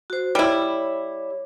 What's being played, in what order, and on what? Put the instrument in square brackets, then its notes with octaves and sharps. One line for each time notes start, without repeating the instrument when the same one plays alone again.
[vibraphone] F#4 C5
[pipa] G3 E4 [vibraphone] C#5